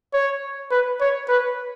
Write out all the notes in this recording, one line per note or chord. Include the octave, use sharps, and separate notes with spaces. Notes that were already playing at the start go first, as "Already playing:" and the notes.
C#5
B4
C#5
B4